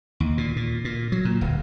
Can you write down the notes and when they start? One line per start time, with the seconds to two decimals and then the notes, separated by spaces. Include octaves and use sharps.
0.20 D#2
0.38 A#2
0.56 A#2
0.85 A#2
1.12 F#3
1.25 A#2
1.41 D1